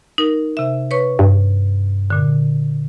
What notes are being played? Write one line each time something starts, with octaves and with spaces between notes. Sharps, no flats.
D#4 A#4
C3 E5
B4 C#5 C#6
G2
A#2 D3